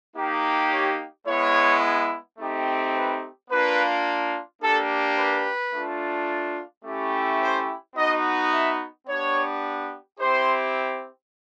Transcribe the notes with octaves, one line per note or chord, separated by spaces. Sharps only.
A#3 D#4 G4
C#5
G#3 B3 E4 C#5
A3 C4 D#4 G4
B4
A#3 D4 F4 B4
A#3 D4 G4 A4
B4
A3 D4 F4
A3 C#4 E4 G4
C5
B3 D#4 F#4 D#5
E5
B3 D4 G4 C#5
C4 E4 G4 C5